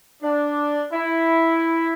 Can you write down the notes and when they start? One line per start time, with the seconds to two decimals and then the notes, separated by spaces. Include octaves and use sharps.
0.22 D4
0.92 E4